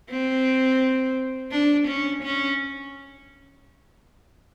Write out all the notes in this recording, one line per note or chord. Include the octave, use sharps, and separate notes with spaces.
C4
D4
C#4
C#4